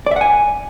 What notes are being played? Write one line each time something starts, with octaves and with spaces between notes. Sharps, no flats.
D5 E5 F#5 G#5